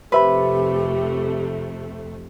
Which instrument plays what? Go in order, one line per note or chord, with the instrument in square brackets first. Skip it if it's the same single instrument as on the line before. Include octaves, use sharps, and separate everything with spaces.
[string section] F2 C3 A3 [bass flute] G4 [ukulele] B4 [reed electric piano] C5 E5 B5